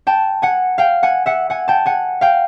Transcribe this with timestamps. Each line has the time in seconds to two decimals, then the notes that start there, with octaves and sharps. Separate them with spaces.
0.07 G5 A5
0.42 F#5 G#5
0.78 F5 G5
1.03 F#5 G#5
1.26 E5 F#5
1.50 F#5 G#5
1.68 G5 A5
1.86 F#5 G#5
2.21 F5 G5